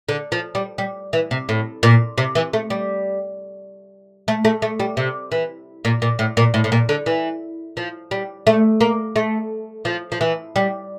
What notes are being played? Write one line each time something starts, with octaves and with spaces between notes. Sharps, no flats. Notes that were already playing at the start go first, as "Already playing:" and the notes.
D3
F3
G3
G3
E3
C3
A2
A#2
C3
E3
A3
G3
A3
A3
A3
G3
C3
E3
A#2
A#2
A2
A#2
A2
A2
A#2
D3
E3
F3
G3
A3
A#3
A3
F3
F3
E3
G3